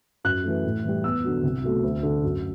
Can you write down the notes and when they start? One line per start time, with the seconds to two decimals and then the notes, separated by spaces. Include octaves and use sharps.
0.24 F#2 F#6
0.44 E3 A3
0.64 A2
0.84 E3 G3
1.04 E2 E6
1.24 D3 F#3
1.43 C2
1.63 B2 F#3 A3
1.83 D2
2.03 D3 A3
2.23 F#2